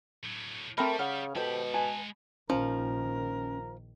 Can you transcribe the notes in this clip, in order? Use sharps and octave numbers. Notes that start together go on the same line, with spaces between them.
A2 F#3
G3 A3 C4 A#4 G5 B5
C#3 F#5 F6
B2 G#3 G4 A4 C5 B5
B4 G#5 A5
A#1 D#3 F3 C#4 A#4